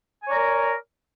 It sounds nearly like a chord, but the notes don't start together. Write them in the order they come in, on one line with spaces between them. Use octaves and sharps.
G#5 C#5 D5 A#5 A#4